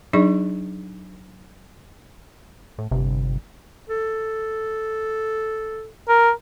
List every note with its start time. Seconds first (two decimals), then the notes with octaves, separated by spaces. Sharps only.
0.13 F#3 D4 D#4 G#4 D5 C#6
2.78 A2
2.91 G1 C3
3.89 A4
6.08 A#4